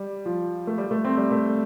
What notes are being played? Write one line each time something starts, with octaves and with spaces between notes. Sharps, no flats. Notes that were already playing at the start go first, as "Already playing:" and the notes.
Already playing: G3
F3
A3
G3
A3
C4
G3
A3